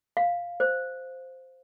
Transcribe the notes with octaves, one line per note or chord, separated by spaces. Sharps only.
F5
C5